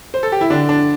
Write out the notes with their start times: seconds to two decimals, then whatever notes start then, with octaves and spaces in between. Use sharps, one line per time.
0.14 C5
0.23 A4
0.32 G4
0.41 E4
0.50 D3 D4
0.69 D4